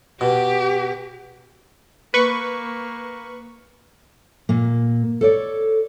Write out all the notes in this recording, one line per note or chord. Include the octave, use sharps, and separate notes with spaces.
B2 G4
A#3 B4 C#6
A#2 A#3
A4 C#5 D5